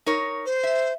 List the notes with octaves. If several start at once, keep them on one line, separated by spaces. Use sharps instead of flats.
D#4 A#4 C#5
C5
E5